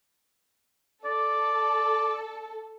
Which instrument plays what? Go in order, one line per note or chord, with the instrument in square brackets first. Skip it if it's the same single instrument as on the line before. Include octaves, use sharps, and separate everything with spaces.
[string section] A4 [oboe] D5